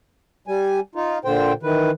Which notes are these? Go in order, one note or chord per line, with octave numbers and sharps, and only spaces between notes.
G3 G#5
D#4 F4
A#2 D3 C5 G5
D#3 E3 B4